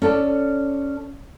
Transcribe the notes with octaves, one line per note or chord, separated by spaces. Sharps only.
C#4 A4 D5 A5